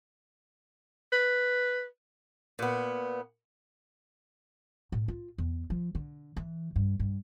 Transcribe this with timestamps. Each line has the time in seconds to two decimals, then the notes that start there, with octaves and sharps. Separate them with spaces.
1.12 B4
2.59 A#2 B3
4.92 A2
5.08 F4
5.38 E2
5.70 F3
5.95 D3
6.37 E3
6.76 G2
7.00 G2